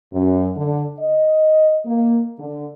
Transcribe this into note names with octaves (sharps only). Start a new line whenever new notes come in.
F#2
D3
D#5
A#3
D3